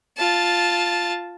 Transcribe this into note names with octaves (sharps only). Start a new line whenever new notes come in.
F4 A5